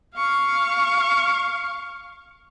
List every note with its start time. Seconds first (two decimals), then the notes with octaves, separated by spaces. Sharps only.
0.17 F5 C#6